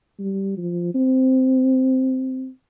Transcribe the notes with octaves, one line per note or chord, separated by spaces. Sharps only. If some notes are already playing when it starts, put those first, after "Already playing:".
G3
F3
C4